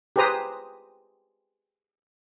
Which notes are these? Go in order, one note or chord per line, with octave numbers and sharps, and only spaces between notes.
G4 G#4 B4 C5 A#5 D#6